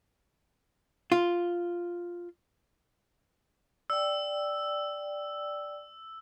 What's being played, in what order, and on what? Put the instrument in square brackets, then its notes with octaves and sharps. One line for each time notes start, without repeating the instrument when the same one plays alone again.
[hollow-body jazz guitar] F4
[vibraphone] D5 G5 [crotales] E6